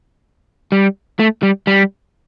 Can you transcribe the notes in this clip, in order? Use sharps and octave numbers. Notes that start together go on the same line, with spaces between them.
G3
A3
G3
G3